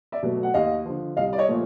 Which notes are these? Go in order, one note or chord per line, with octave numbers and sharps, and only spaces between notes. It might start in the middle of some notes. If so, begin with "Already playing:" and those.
D5 E5
B2 F#3 A3
F#5
D#2 D#5 F5
D3 F3
C2 D#5 F5
D5
C#5 D#5
A#2 F3 A3